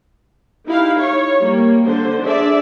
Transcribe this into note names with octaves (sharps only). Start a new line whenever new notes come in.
D#4 E4 G4 F5
C#5
G3 A#3
D3 C5
D4 G#4 D5 E5